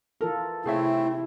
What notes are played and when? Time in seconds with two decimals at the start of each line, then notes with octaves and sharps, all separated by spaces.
0.21 E3 F4 A4 A#4
0.66 C3 A3 C4 E4 G#4 C#5 E5